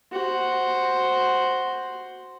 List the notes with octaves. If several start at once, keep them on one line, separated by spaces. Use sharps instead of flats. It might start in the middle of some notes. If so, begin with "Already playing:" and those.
F#4 C5